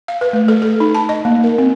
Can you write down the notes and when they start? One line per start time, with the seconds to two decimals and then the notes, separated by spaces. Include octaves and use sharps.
0.08 F5
0.21 B4
0.33 A3
0.48 A4
0.62 A4
0.80 D#4
0.95 A5
1.09 D#5
1.25 A#3
1.44 A#4
1.58 C4